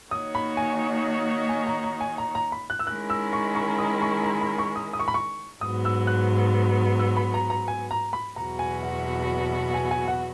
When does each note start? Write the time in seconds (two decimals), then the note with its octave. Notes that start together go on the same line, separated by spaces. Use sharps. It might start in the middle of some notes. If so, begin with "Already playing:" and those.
0.11 D#3 A#3 D#4 F#4 C#5 D#6
0.35 B5
0.57 G#5
1.49 G#5
1.67 A#5
1.84 A#5
2.01 G#5
2.18 A#5
2.35 A#5
2.52 B5
2.70 F#6
2.79 E6
2.87 D#3 G#3 C#4 E4 A#4 F#6
3.10 E6
3.33 C#6
3.55 C#6
3.78 D#6
4.02 C#6
4.24 A#5
4.41 B5
4.58 C#6
4.76 D#6
4.93 D#6
5.00 C#6
5.08 B5
5.14 C#6
5.61 G#2 F#3 B3 D#6
5.85 E6
6.07 F#6
6.99 E6
7.17 B5
7.34 A#5
7.50 A#5
7.68 G#5
7.91 A#5
8.13 B5
8.36 E2 B2 F#3 B3 F#4 A#5
8.59 G#5
8.83 F#5
9.74 G#5
9.91 G#5
10.08 F#5